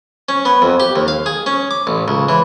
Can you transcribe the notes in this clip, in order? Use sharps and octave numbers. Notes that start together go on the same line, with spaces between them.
C#4
B3
F2
G4
D#2
F5
G#4
C#4
D6
A1
C#2
E3